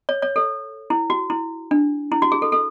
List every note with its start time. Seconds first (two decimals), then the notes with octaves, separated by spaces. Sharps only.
0.09 C#5
0.22 C#5
0.36 A4
0.90 E4
1.10 F#4
1.30 E4
1.71 D4
2.12 E4
2.22 F#4
2.32 G#4
2.42 A4
2.52 A4